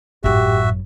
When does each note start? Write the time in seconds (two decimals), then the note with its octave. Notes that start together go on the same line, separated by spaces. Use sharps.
0.24 G#1 F#2 A2 F#4 G4 E5